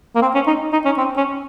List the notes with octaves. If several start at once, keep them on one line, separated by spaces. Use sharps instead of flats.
A#3
C4
C#4
D#4
D#4
C#4
C4
C#4